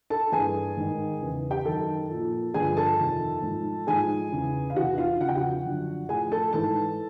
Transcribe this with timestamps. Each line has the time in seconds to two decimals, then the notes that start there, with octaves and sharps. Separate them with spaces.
0.10 A4 A5
0.32 G2 E3 G#4 G#5
0.77 G#2 D#3
1.21 E2 C#3 E3
1.51 G4 G5
1.65 F#2 D#3 A4 A5
2.10 A#2 F3
2.54 G2 D3 F3 G#4 G#5
2.77 A4 A5
2.99 F2 C3 D#3
3.42 G#2 F3
3.87 G#2 F3 G#4 G#5
4.32 E2 C#3 E3
4.70 F5
4.76 E2 C3 E3 F#4 F#5
4.98 F4 F5
5.20 E2 C#3 F3 F#5
5.29 G5
5.36 F#4 F#5
5.65 F#2 D3 F3
6.09 A2 F3 G#4 G#5
6.32 A4 A5
6.53 G#2 E3 A4 A5